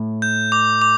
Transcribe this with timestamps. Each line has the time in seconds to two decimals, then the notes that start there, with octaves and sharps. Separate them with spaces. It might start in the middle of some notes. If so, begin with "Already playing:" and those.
Already playing: A2
0.22 G6
0.52 D6
0.82 D6